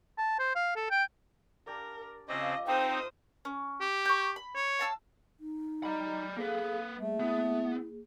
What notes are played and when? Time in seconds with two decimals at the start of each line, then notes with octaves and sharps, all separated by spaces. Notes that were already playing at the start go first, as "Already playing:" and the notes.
0.18 A5
0.39 C5
0.56 F5
0.76 A4
0.91 G5
1.67 D4 G4 A#4 D5
2.28 C#3 F3 C4 D#5 E5 D6
2.67 C4 D#4 A4 A#4 C5 G5 D#6
3.45 C#4
3.81 G4
4.05 C#6 G6
4.36 B5
4.55 C#5
4.79 F5 A5 E6
5.40 D#4
5.83 D5 D#5 A#5 B5
6.37 A#3 G#4 A4 B4 F5
6.98 G3 A3 A#3 G#4
7.20 B3 E4